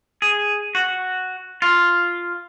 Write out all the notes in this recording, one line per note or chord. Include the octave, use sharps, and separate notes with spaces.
G#4
F#4
F4